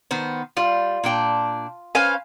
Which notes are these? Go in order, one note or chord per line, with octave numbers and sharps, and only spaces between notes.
D#3 B3 C5
G3 F4
A#2 D4 G5
C#4 B4 C5 F5 G#5